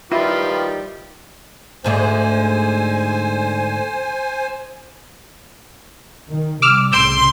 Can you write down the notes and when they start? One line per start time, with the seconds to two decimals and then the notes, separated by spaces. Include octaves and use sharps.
0.12 D#3 F3 G3 E4 F4 G4 B4
1.84 D2 G#2 D3 C5 G#5
6.28 D#3
6.62 C3 G3 D6 E6 F6
6.92 C2 A2 C#3 C6 E6 G6 D7